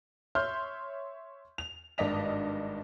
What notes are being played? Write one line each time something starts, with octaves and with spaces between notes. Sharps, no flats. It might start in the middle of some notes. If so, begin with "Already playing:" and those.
C#5 E5 C6 F6 G6
F7
G#1 G2 D5 D#5 B6 F7